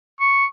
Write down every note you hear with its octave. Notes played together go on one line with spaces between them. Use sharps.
C#6